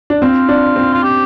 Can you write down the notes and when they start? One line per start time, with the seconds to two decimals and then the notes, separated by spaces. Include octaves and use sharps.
0.10 D4
0.22 C4 F4
0.49 D4
0.76 C4
0.94 F4
1.03 G4